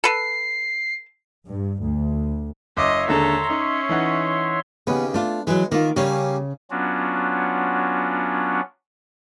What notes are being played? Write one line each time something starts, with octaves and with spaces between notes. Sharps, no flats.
A4 B4 C7
G2
D2
F#1 C#5 D#5 E5 C6 D6
D#2 D3 G#3 A4 A#5
C#4 D#4
E3 D#4 F#5
D#2 C#3 B3
A3 D4 F4
E3 F#3 G#3
D#3 A#3 F4
C#3 G3 A#3 C#4 C#5
F#3 B3 C#4 D4 F4 F#4